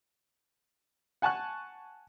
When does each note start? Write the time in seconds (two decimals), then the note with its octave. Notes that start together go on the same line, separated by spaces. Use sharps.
1.22 F#5 G#5 A5 C#6 F#6